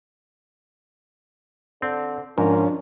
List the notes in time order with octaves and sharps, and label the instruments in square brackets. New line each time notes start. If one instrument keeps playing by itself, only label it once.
[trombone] D3 [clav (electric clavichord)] C4
[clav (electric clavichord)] G#2 [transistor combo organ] F3 C#4 [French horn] D4 [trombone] A#4